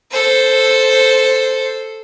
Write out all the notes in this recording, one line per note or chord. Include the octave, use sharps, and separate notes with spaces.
A4 C5